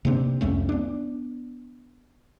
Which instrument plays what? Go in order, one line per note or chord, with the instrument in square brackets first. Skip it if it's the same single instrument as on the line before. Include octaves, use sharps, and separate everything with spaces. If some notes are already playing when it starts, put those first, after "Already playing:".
[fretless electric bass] C3 A#3 C4 D4
C2 F2 A3 C#4
B3 D4